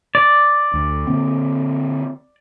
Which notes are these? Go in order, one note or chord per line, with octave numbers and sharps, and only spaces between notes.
D5
D2
D3 A#3 C4